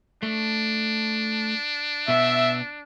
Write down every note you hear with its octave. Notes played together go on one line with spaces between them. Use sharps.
A3 D4
B2 B3 E5